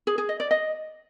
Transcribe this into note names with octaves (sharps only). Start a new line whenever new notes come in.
G#4
G#4
D#5
D5
D#5